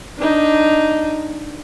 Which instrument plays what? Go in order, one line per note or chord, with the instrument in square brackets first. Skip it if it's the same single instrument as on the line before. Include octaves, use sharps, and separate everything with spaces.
[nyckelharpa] D4 D#4